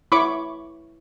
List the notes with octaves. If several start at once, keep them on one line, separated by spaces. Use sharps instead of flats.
E4 C#5 B5 C#6 D6